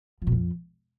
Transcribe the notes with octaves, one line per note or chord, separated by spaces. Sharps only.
F3
B2
F2